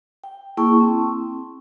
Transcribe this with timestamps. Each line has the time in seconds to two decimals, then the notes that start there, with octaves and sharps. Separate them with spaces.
0.24 G5
0.57 A#3 E4 G#4 G5 A5 C#6
0.80 C4